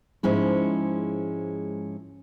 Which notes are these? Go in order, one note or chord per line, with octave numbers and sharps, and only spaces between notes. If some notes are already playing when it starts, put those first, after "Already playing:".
G#2 F3 G#3 C#4 E4